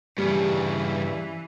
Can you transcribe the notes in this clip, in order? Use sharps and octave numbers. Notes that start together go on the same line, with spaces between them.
G2 C#3 E3 G3